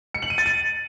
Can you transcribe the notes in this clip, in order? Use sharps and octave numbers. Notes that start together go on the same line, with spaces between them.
C#7
F#7
D#7
A6
D#7